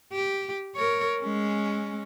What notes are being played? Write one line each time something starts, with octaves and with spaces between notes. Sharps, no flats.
G4
A#4 C#5
G#3 C#4